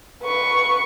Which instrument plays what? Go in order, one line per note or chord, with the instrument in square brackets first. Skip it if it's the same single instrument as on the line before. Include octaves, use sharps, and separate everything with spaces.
[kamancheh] B4 C#6